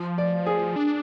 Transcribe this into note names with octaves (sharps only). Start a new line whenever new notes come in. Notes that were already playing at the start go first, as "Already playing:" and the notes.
Already playing: F3
D5
G#4
D4